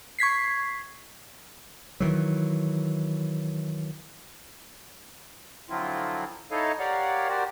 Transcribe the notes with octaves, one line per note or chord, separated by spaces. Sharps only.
C#6 G#6 B6 C7
D#3 E3 F#3
D3 F3 F#3 C4 E4 F4
D#4 E4 A4 C#5 D#5 F5
G4 A#4 C#5 D5 F5 F#5
F#4 G4 A#4 C5 D5